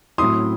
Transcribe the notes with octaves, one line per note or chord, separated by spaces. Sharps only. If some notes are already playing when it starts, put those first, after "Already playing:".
A2 F#3 C4 E4 C6 D#6